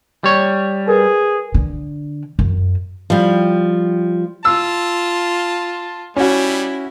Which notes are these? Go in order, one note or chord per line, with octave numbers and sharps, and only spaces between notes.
G3 C#5
G#4 A#4 B4
D3
F#2
F3 G3
F4 A5 E6
G3 C#4 E4 F#4